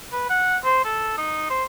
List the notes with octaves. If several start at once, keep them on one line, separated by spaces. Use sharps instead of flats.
B4
F#5
C5
A4
D#4
C5